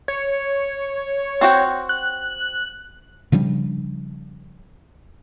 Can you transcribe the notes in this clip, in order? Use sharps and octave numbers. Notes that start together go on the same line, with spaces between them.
C#5
C4 F#4 G5
F#6
C#3 F3 G3 D4